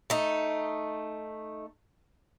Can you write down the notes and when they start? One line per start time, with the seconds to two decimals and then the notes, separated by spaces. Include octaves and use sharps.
0.10 A3 D#4